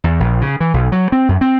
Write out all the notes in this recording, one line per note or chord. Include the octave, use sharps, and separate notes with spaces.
E2
A#1
C#3
E3
B1
F#3
C4
F#2
C4